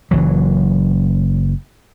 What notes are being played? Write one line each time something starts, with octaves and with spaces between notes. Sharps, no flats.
F#1 E3 F#3